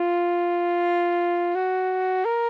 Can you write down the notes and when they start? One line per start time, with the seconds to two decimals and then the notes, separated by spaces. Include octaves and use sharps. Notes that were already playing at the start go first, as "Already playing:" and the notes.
Already playing: F4
1.55 F#4
2.25 A#4